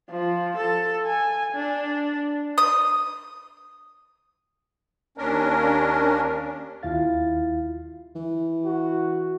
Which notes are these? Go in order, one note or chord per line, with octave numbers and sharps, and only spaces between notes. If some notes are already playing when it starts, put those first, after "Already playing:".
F3
A4
G#5
D4
D#6
D#2 C#4 D4 A#4
D#2 E4 F4 F5 A6
E3
F#4